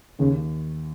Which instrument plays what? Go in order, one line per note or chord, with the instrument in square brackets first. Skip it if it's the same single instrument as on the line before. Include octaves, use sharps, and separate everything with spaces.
[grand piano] D#2 [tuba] C#3